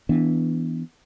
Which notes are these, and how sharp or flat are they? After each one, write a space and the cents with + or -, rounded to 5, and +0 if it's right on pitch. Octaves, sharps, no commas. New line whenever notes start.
E3 -10 B3 +0 D4 -10